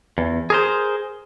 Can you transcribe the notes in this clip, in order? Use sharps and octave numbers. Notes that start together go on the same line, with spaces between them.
E2
G#4 A#4 C5